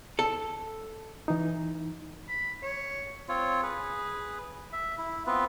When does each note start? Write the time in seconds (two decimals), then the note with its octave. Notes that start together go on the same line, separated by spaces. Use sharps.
0.19 A4
1.28 E3 D#4
2.29 B5
2.62 C#5
3.29 C4 F4 C#5
3.63 G#4 B4
4.73 E5
4.98 E4
5.26 B3 C4 F4 B4